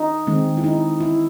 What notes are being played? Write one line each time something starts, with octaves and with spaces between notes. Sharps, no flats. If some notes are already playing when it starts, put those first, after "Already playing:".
Already playing: D#4
D#3 G#3 C4
E4
D#4
E4